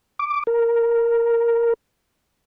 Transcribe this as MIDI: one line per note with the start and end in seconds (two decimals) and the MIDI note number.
0.19 0.43 86
0.47 1.73 70